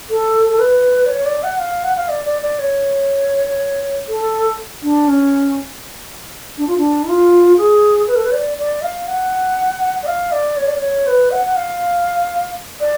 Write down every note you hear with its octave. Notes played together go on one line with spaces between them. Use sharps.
A4
A4
B4
D5
C#5
D5
F#5
F5
F#5
F5
D5
D5
D5
C#5
A4
D4
C#4
D4
F4
D4
F4
G#4
B4
A4
B4
D5
D5
F5
F#5
D5
F5
D5
C#5
D5
C#5
B4
F#5
F#5
F5
D5